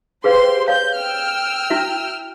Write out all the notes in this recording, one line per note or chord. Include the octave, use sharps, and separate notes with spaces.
G4 G#4 B4 C5 F5 C6
C#5 F5 G6
G5 E6 F6
E4 F#4 E5